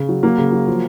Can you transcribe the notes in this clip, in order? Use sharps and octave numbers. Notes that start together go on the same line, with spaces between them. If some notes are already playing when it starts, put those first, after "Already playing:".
Already playing: C#3
F#3
F#3 A#3
C#3
F#3
F3